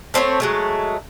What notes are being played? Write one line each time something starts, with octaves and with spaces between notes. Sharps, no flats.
A3 C4 B4 C#5
F#3 G#3 A3